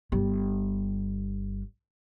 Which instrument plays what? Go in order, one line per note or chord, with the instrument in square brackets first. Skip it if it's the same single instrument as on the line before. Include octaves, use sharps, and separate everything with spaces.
[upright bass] G1 G3